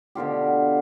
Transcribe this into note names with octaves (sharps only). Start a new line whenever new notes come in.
B2 D3 F4 G4